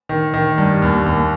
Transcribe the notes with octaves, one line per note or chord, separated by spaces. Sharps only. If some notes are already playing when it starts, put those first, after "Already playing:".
D#3
D#3
G2
D#2
D#2